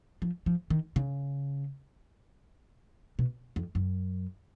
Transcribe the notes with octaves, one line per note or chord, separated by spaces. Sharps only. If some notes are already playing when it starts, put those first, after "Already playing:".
F3
F3
D#3
C#3
B2
F2
F#2